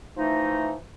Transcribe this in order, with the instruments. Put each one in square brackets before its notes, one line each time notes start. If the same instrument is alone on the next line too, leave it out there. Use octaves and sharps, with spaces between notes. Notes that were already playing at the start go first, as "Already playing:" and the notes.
[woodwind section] E3 F3 A3 D#4